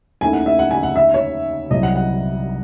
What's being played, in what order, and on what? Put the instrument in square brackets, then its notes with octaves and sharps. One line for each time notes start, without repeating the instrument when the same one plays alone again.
[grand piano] D#2 D#3 A3 C#4 E4 [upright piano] G#5
[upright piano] F#5
E5
F#5
G#5
F#5
E5
C#5
[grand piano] C2 C3 F#3 C4 E4 [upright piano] D#5
[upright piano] F#5
F#5